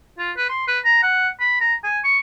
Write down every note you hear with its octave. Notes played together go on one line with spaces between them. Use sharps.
F4
B4
C6
B4
A#5
F#5
B5
A#5
G#5
C#6